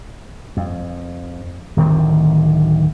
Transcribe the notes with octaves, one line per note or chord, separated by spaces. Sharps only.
F2
D1 D2 D#3 C4